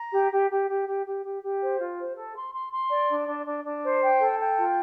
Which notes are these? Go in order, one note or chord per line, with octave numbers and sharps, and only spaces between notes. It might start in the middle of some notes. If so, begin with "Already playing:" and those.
Already playing: A#5
G4
G4
G4
G4
G4
G4
G4
G4
C5
F4
C5
A4
C6
C6
C6
D5
D4
D4
D4
D4
C5
G5
A4
G5
F4